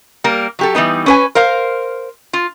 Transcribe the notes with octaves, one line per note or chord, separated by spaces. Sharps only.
G3 A#3 A#4
F#3 G4 A4
E3 G3 B3 D#4
C#4 B4 G#5
A#4 C5 F5
F4